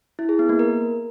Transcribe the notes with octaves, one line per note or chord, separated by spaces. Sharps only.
E4
G#4
B3
A#3
A#4